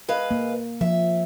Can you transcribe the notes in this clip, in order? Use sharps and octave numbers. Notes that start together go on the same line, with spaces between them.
G#3 B4 F5
A#3
F3 E5